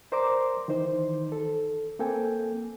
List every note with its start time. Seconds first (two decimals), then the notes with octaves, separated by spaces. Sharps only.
0.12 A#4 C5 D5 A#5 C6 D6
0.68 D#3 E3 D#4 C5
1.32 A4
1.99 A#3 C4 A4 G5 G#5